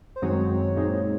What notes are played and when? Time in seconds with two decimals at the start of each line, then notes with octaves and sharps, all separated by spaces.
0.16 C5
0.22 F#2 D#3 G#3 C4 F#4 C#5
0.76 A#2 G#3 C4 D#4